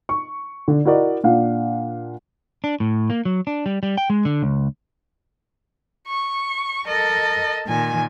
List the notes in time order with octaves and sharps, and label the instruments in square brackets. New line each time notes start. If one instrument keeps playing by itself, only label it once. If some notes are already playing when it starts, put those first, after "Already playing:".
[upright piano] C#6
D3
E4 F#4 A#4 D5 D#5
A#2 D4 F5 F#5
[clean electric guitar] D4
A2
A#3
F#3
D4
G3
G3
G5
G#3
D3
C#2
[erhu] C#6
[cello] A4 A#4 [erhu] D#5
[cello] A#2 D#3 [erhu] G#5